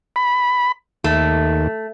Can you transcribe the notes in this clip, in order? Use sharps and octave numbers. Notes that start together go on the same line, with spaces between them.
B5
D#2 A3